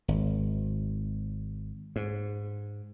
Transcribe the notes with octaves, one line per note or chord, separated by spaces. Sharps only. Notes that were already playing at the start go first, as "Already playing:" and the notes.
G#1
G#2